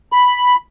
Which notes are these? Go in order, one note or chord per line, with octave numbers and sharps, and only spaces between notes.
B5